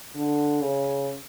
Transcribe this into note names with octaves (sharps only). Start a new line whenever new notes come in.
D3
C#3